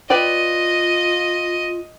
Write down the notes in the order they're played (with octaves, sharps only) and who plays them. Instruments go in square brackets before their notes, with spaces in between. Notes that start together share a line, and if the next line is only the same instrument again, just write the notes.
[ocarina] F4 [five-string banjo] B4 D5 G5 [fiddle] D#5